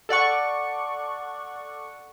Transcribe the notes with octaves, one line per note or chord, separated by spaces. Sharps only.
A4 D5 F#5 C#6